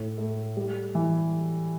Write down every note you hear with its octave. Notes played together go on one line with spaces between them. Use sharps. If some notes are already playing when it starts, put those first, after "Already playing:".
Already playing: A2
A3
G3
E3